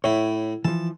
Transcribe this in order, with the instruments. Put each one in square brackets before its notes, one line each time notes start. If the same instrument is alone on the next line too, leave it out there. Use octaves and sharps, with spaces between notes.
[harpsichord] A2 E4 [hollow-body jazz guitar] C#5
[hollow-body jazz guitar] E3 F3 [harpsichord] A5